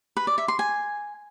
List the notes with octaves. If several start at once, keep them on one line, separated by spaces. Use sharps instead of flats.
B4
D5
E5
C6
G#5